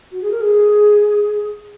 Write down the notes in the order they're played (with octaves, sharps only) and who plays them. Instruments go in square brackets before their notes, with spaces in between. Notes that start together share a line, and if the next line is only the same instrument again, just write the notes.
[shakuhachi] F#4
G#4
A#4
G#4